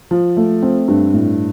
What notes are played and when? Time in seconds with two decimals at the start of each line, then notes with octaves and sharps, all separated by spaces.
0.11 F3
0.37 A3
0.63 C4
0.88 G2
1.14 A2